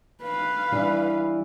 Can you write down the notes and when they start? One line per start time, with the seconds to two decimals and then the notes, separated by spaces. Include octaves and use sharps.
0.22 B4 F5
0.72 E3 G3 D4